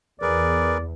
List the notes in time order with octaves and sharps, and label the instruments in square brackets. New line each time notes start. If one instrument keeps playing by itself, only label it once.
[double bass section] E2 [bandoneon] G#4 A#4 B4 [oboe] D5